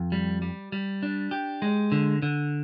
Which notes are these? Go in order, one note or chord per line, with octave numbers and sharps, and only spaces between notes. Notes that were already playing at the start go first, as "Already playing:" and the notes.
Already playing: F2
G3
G3
G3
D4
G4
G#3
D3
D3